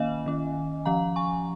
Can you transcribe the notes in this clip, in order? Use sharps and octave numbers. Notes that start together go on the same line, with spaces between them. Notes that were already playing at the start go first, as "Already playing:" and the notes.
Already playing: D#3 A#3 C#4 D#5 F5 G#5
D#3 C#4
F3 C#4 F5 A#5
G#5 C#6